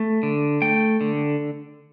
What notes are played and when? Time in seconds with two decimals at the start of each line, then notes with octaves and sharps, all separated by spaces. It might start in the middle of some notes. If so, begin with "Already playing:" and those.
Already playing: A3
0.23 D3
0.62 A3 G5
1.01 D3